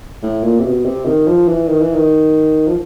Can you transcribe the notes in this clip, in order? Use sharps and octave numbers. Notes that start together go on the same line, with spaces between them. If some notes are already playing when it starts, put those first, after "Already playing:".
A2
A#2
C3
B2
C3
D#3
F3
E3
D#3
E3
D#3
F3